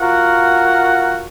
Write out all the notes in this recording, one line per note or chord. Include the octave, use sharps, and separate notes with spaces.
F4 F#4 A#4 F#5